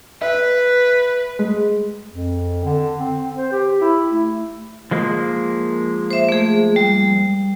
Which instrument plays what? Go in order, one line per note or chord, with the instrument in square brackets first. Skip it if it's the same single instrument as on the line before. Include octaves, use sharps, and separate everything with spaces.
[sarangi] B4 [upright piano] E5
[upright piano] G#3
[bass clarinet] F2
D3
C4
C5
G4
E4
A3
[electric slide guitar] F3 G#3 A#3
[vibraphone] C5 E5
A3 G#4
G3